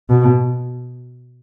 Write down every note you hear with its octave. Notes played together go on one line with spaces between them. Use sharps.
B2